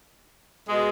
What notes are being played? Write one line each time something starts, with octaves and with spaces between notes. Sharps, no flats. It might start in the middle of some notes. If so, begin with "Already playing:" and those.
B2 G#3